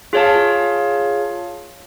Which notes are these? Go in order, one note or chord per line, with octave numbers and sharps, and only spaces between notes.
F4 G#4 C#5 F5 A5